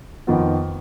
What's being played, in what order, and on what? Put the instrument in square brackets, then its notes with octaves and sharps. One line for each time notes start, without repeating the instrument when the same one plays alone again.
[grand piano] F2 D#3 B3 F4